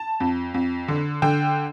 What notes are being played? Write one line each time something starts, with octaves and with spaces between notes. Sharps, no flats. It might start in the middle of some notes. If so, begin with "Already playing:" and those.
Already playing: A5
F2
F2
D3
D3 G5